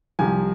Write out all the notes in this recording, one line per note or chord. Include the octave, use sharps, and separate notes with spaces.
C2 C3 F3 G#5